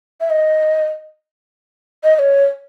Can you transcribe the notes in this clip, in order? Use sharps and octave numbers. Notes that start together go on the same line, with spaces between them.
E5
D#5
D#5
D#5
C#5